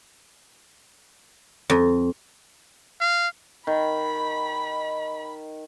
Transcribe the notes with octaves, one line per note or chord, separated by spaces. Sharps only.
F2
F5
D#3 B5